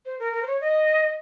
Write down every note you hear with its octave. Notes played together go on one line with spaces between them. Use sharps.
C5
A#4
A#4
C5
C#5
D#5